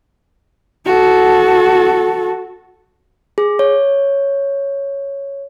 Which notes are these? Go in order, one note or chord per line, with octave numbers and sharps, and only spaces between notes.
F#4 A4
G#4
C#5